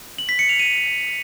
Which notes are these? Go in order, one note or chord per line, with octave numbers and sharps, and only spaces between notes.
F#7
B6
C#7
F7
D#7